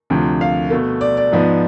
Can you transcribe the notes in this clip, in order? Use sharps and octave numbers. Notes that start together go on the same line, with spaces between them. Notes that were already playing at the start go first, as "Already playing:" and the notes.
D2 C3 F3
F5
B2 A3
D5
D5
G#2 F3 B3